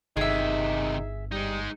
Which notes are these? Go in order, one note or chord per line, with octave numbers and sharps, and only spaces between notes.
G1 C3 D#3 D#4 G#4 E5
G3 G#3 D#4